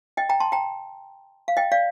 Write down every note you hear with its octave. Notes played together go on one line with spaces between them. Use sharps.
D#5 G5
G5 A#5
A5 C6
G5 A#5
F5
D#5 G5
D5 F5